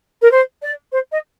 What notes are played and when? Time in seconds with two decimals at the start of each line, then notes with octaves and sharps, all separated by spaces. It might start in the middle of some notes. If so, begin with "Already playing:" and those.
0.22 A#4
0.31 C5
0.62 D5
0.92 C5
1.12 D#5